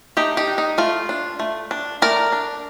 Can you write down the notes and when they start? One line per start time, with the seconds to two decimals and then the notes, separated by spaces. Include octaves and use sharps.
0.17 A3 D#4 G4
0.37 D#4 G4
0.47 D4
0.58 D#4
0.78 A3 F4
1.09 D4
1.40 A3
1.71 D4
2.02 A3 A#4 D5
2.32 D4